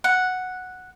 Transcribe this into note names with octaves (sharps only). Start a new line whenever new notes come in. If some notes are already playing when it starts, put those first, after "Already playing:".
F#5